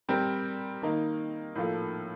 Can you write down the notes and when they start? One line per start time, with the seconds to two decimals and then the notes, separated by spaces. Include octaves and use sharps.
0.08 G3 C4 G4 A#4
0.82 D#3 A#3 D#4
1.55 A2 F3 A#3 F4 A4